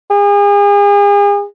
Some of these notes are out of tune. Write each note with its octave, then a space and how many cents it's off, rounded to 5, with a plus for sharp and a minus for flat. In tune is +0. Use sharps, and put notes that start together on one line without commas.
G#4 -40